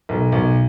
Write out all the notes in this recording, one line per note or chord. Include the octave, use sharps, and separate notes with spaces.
B1
B1